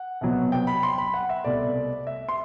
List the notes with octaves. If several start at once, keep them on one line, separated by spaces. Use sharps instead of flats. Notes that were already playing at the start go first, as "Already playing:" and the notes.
Already playing: F#5
C2 B2 F#3 B3
G5
B5
C6
B5
F#5
E5
C2 B2 A3 D5
E5
C6